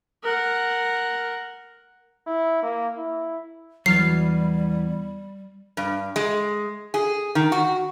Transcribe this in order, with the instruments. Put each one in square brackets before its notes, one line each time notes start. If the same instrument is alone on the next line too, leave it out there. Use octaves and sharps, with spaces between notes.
[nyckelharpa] A#4 F#5
[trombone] E4
A#3
E4
[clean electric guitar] E2 E3 B3 [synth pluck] F#3 F6 A6 [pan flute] G3 [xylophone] C7
[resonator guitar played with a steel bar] G2
G#3
G#4
D#3
F#4